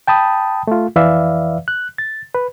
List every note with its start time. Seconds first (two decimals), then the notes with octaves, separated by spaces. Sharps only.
0.07 G5 A5 B5 D#6
0.67 A3 F4
0.96 F2 E3 B4 D5 E5 F5
1.68 F#6
1.98 A6
2.34 B4